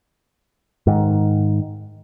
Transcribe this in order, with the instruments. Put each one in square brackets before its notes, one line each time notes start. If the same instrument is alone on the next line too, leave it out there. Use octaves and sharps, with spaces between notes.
[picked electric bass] G#2 D#3